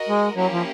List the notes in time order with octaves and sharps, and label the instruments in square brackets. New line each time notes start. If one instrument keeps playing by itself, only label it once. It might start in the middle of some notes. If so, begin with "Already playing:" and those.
Already playing: [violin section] F#4 A#4 D#5
[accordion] G#3
[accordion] F#3 [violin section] A#3 C#4 E4 G4
[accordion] F3